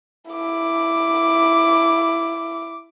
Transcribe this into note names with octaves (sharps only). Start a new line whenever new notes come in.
E4 D6